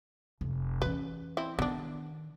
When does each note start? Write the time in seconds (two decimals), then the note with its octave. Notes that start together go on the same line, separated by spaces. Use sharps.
0.41 F1
0.82 E3 C#4 B4
1.37 C4 E4
1.59 D#3 B3 D4